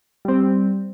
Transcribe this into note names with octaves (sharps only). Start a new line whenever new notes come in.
G3 C4